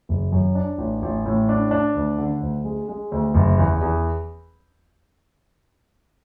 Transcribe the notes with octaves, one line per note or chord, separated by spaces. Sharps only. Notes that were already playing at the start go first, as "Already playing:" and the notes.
F#1
F#2
D4
A1
A1
A2
D4
D4
D2
D3
D2
G#3
G#3
D2
F#1
E2
E2